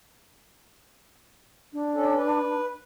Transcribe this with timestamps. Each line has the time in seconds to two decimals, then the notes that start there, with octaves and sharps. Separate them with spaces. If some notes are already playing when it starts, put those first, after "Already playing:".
1.73 D4
1.94 C#4 A4
2.16 B4